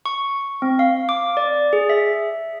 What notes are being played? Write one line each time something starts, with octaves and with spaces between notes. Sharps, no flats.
C#6
C4
F5
D6
D5
G#4
E5